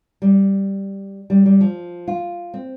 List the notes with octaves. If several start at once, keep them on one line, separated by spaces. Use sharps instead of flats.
G3
G3
G3
F3
F4
C4